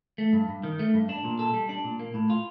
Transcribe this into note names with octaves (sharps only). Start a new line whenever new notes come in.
A3
G2
G2
D#3
A3
G2
D4
A#2
A4
G3
D4
A#2
A#3
A2
F4